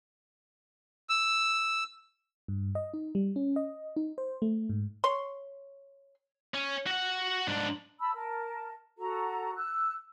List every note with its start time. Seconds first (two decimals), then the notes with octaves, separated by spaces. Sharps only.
1.09 E6
2.48 G2
2.75 D#5
2.94 D#4
3.15 G3
3.36 C#4
3.56 D#5
3.96 D#4
4.18 C5
4.42 A3
4.69 G#2
5.04 C#5 C6
6.54 C#4
6.87 F#4 F#5
7.47 G#2 D4
8.00 A5 B5 E6
8.15 A#4 A5
8.98 F#4 A4 A#5
9.55 E6 F#6